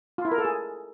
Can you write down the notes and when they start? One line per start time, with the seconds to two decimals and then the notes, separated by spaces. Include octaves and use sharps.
0.18 F4
0.25 E4
0.32 A#4
0.38 A4
0.45 G#4